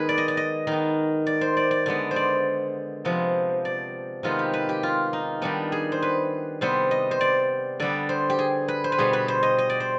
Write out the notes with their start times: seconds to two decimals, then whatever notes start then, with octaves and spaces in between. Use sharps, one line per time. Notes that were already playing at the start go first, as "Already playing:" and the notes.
Already playing: D#3 G#3 B3 G#4 B4
0.09 D5
0.18 D#5
0.28 D5
0.37 D#5
0.67 D#3 B3
1.27 D5
1.41 C5
1.57 D5
1.71 D5
1.86 D3 G#3 B3 D5
2.11 C5
2.16 D5
3.05 C3 F3 B3
3.65 D5
4.23 C3 D#3 G#3 B3 F4
4.39 G4
4.54 B4
4.69 G4
4.83 F4
5.13 D#4
5.42 D#3 G3 B3 D4
5.72 G#4
5.92 C5
6.02 B4
6.61 C3 G3 B3 C5
6.91 D#5
7.11 C5
7.21 D5
7.80 D3 G3 B3 D5
8.09 C5
8.30 G4
8.39 G#4
8.68 B4
8.84 C5
8.92 B4
8.98 B2 G3 B3 G#4
9.13 B4
9.28 C5
9.43 D#5
9.58 D#5
9.70 D5
9.80 C5